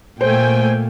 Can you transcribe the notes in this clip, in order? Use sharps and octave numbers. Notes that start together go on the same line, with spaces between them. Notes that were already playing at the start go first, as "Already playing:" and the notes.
A#2 A3 C5 G5 G#5